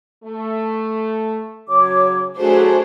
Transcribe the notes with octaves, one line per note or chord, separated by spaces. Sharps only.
A3
C#3 F#3 C#5 D6
A2 F#3 A3 D4 F#4 G#4 C5